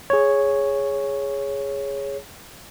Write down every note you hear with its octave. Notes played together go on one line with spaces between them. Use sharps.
G#4 C#5